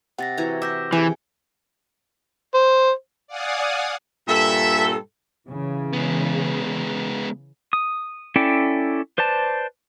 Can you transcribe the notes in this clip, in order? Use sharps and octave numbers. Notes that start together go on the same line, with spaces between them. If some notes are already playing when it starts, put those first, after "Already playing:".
C3 F#5 A6 A#6
E3 F#4 A#5
E5 D6 G6 A#6
C3 E3 G#4 G#5
C5
D5 F5 F#5 G#5 D#6
G2 A#2 A4 E5
C#3 E3
G#3 B3
D#6
C#4 E4 A4 D5 G5
B4 C5 D5 A5